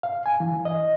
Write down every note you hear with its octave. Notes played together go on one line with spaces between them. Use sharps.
F5
G#5
E3
D#5